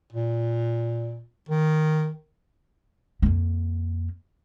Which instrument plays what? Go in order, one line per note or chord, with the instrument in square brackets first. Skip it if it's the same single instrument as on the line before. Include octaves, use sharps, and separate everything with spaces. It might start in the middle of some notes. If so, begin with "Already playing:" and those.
[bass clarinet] A#2
D#3
[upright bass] F2 A#3